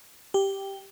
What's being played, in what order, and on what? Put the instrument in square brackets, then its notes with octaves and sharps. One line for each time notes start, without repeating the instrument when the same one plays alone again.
[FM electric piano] G4